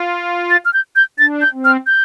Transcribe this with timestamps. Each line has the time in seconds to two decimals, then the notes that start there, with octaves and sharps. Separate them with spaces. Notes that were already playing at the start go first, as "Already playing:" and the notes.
Already playing: F4
0.50 A6
0.65 F6
0.74 G6
0.96 G6
1.19 D4 A6
1.41 G6
1.53 C4
1.65 F6
1.87 G6